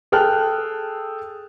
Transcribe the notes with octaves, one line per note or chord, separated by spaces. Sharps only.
G#4 A4 G5 F6 F#6